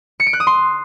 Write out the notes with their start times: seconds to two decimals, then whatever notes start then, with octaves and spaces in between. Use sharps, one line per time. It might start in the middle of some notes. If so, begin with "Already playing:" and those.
0.20 C#7
0.26 D7
0.33 F#6
0.40 D#6
0.47 C6